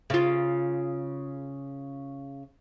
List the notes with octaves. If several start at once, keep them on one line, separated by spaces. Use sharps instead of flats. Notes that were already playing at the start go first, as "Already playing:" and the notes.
C#3 F4